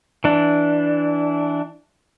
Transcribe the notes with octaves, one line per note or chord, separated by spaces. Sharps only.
E3 D4